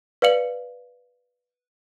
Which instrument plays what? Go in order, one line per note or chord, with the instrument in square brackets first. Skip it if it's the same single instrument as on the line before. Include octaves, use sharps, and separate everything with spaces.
[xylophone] B4 D5 F5 C#7 F#7